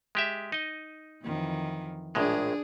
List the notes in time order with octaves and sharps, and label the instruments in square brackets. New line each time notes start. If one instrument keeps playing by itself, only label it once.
[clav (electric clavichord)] G#3 G4 E5
D#4 D#5
[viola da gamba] F2 D#3 E3
[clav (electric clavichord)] A#1 A2 G#3 [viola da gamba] D4 G#4